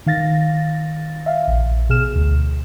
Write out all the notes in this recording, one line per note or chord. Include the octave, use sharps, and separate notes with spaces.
D#3 F5 A6 A#6
E5 F5
A#1
B2 G#4 F6 E7
D2